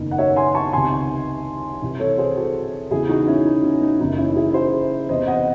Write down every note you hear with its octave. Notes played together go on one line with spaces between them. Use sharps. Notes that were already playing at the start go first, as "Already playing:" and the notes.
Already playing: F#1 E2 D#3
F#5
C#5 E5
G#5 C6
A5 C#6
C#2 C3 D#3 G#5 C6
C2 C3 E3
A4 C#5
G#4 C5
F#4 A4
E2 C#3 E3 E4 G#4
D#4 F#4
C#4 E4
D#4
C#4
D#4
F#1 F#2 C#3 E3 D#4
C#4 E4
E4 G#4
G#4 C5
E2 C3 E3 C5 D#5
D#5 F#5